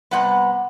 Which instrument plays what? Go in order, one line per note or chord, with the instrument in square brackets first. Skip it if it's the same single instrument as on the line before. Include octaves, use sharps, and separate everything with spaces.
[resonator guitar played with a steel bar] C3 G3 B3 F#5